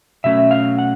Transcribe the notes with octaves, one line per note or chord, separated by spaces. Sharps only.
B2 F#3 A3 C#4 E5
F5
F#5